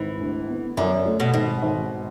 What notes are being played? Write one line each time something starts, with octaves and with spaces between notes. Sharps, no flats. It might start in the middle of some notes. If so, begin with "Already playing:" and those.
Already playing: G#1 E3
D2
B3
F#2 D3
A3
B2
G#1 B2
G#1